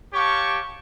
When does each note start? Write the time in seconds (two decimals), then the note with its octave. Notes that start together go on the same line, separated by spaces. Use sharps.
0.13 G4 C#5 F5 A5 C#6